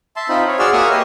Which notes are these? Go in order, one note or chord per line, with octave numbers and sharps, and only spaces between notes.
E5 A5 C6
C4 D#4 F4 C5 B5
C#5
F#4 G#4 D5 C6 E6 F6
A#3 E5 C#6 D#6 F6
G4 B4 C#5 D#5